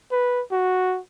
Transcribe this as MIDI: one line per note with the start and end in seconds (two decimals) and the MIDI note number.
0.12 0.42 71
0.52 1.00 66